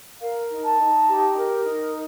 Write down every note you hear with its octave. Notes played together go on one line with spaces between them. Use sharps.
A#4 F5
D#4
A5
D#4
G4
A#4
D#4